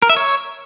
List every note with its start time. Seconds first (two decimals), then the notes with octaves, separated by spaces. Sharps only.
0.02 A#4
0.09 E5
0.17 C#5